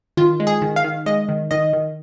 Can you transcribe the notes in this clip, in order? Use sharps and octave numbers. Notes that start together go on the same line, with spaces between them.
D#3 F4
G#3
G#4
D#3
F5
D#3
G#3 D#5
D#3
D#3 D#5
D#3